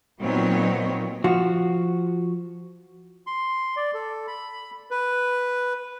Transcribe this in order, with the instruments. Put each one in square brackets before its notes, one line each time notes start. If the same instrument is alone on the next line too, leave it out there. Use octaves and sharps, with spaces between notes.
[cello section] A#2 F#3 B3 C4 D#4 C#5
[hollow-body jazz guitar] F3 F#4
[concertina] C6
D5
A4
B5
B4